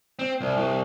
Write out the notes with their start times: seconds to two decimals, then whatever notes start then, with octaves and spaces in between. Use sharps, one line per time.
0.19 C4
0.41 C2
0.57 C2